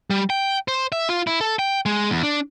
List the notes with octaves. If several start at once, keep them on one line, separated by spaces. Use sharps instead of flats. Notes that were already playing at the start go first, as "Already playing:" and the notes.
G3
G5
C5
E5
F4
E4
A4
G5
G#3
E2
D4